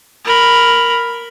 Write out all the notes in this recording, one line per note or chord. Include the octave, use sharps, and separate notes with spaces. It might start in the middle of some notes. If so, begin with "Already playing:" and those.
A#4 B5